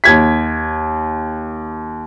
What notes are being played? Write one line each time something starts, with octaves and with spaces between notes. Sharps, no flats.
D#2 G#6 B6